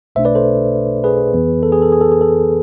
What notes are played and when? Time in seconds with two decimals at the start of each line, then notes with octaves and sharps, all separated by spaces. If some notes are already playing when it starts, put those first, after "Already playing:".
0.15 B1 B2 A3 D4 C5 E5
0.25 B4 D5
0.35 A4 C5
1.04 G#4 B4
1.33 F2 E3 B3
1.63 A4
1.72 G#4
1.82 A4
1.92 G#4
2.01 A4
2.12 G#4
2.21 A4